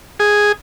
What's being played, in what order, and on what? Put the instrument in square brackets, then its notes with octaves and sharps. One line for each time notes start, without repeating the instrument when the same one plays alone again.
[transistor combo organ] G#4